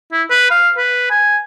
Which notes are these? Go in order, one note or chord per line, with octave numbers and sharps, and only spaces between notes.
E4
B4
F5
B4
G#5